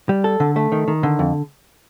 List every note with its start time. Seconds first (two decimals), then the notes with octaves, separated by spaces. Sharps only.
0.09 G3
0.24 A4
0.40 D3
0.56 A3
0.72 D#3
0.88 D#3
1.03 D3
1.19 F2